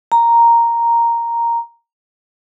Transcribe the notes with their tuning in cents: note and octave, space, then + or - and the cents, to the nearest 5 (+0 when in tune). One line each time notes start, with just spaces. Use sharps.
A#5 +0